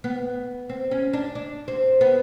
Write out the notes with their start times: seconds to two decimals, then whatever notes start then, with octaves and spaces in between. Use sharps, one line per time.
0.04 B3
0.69 C4
0.91 C#4
1.13 D4
1.35 D4
1.68 C4
2.01 B3